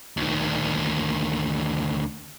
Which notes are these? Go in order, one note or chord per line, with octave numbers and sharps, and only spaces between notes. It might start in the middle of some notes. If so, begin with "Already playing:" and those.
D2 D#3